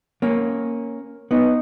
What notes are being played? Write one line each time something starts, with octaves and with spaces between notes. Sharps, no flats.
A#3 C#4
B3 D#4